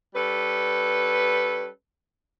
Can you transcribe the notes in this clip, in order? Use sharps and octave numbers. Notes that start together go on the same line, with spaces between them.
G3 C#4 A4 B4